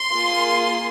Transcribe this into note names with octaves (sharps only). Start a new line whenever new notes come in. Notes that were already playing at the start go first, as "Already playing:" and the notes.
Already playing: C6
A#3 F4 G#4